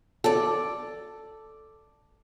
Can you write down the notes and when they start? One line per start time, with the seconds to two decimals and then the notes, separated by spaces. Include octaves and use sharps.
0.24 A4 D5